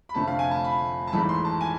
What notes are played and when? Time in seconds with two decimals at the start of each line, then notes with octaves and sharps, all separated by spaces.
0.09 B5
0.15 F1 F2 D3 A3 A5
0.28 F5
0.39 G#5
0.51 A5
0.64 B5
1.07 A5
1.12 G#1 G#2 E3 A3 B5
1.29 C6
1.45 A5
1.61 G#5